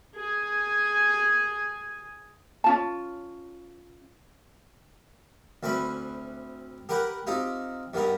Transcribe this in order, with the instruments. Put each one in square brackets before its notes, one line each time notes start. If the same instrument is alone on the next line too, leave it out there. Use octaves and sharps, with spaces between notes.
[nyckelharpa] G#4 G#5
[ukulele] C#4 F4 A5
[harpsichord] D2 C4 C#4 B4 B5
G4 A#4 B4 F#5 G5
C4 D#4 F4 G4
G2 D#3 B3 G4 A#5